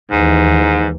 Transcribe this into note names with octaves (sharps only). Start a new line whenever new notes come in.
D#2 G#2 E3